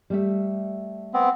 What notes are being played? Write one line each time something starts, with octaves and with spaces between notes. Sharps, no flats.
G3 A3 E5
B3 C4